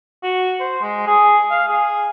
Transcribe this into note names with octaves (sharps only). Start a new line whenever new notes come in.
F#4
C5
G#3
G#4
F5
G#4